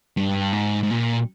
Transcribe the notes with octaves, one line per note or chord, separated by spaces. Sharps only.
G2
G#2
G#2
A#2